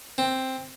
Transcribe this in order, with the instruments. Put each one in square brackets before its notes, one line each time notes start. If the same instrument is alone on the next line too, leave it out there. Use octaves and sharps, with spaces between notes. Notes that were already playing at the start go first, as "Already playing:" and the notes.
[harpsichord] C4